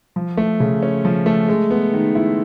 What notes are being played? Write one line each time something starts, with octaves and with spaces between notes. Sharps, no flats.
F3
A3
C#3
C#4
F3
A3
G#3
B3
D#3
E4